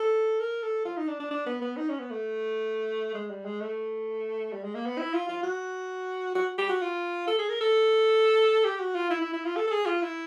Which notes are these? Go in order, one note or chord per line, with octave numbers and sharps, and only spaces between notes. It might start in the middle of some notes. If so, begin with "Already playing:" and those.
Already playing: A4
A#4
A4
F4
D#4
D4
D4
D4
B3
B3
D#4
C#4
B3
A3
G#3
G3
G#3
A3
G3
G#3
A#3
B3
E4
F4
F4
F#4
F#4
G4
F#4
F4
A4
G#4
A#4
A4
G4
F#4
F4
E4
E4
E4
F4
A4
A4
G#4
F4
E4